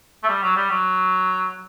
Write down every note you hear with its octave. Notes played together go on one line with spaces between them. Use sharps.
A3
G3
F#3
G3
F#3